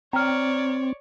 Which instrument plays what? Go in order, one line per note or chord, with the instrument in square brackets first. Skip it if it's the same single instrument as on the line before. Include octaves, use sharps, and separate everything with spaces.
[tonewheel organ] C4 [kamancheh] C#5 D5 [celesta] A#5 F6